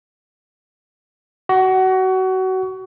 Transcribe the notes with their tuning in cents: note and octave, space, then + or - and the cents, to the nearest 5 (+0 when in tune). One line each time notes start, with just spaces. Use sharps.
F#4 +25